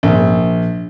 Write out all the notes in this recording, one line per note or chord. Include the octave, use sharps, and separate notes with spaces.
A#1